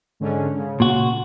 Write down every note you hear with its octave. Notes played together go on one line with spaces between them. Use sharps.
G#2 D3 C#4
C#3
A#2 F#4